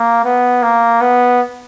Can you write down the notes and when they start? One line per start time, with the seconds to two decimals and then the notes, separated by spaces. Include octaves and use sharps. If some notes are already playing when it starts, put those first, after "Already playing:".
Already playing: A#3
0.24 B3
0.62 A#3
1.01 B3